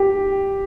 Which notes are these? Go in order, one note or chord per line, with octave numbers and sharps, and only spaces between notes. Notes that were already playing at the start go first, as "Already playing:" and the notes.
Already playing: G4